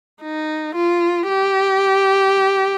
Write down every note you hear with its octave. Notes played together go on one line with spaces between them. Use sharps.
D#4
F4
G4